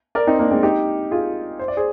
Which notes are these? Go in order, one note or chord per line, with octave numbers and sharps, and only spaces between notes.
A#4 D5
C4 D#4
A#3 D4
G#3 C4
D#4 G4
F4 G#4
C5
D5
G#4 C5